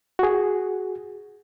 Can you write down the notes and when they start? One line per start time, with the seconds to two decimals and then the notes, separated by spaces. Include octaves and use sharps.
0.19 F#4 G#4